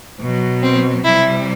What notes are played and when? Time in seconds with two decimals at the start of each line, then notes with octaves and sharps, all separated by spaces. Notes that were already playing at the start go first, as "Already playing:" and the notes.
0.19 B2 F#3
0.62 C4
1.05 C3 G3 E4